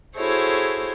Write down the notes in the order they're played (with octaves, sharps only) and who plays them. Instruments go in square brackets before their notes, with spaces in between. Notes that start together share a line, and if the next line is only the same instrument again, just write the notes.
[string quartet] E4 F#4 G#4 A4 C5 C#5